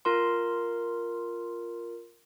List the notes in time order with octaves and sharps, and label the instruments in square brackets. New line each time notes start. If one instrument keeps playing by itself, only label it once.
[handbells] F4 A#4 C6